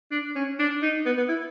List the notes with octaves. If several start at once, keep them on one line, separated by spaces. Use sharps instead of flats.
D4
C#4
D4
D#4
B3
B3
E4